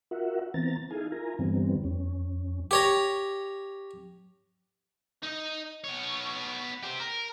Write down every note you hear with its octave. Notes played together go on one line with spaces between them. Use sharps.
F4 F#4 A#4 E5 F#5
E3 B3 C4 A#5 A6
D#4 E4 G#4 A4 F5 G#5
E4 F4 A#4 G#5 A#5
G2 D3 E3 G3 B3 C4
F2 C#4
G4 C#5 A#5
D#4 D#5
B3 C#5
G4 C5
A#4